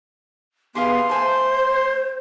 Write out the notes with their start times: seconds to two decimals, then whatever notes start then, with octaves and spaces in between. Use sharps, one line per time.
0.75 B3 G4 G#4 F5 C6
1.09 A3 C5 G#5 A5